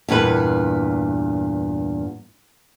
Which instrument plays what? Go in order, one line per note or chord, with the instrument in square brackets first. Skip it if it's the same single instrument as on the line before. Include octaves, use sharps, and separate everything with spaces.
[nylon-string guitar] E2 G2 A#2 B4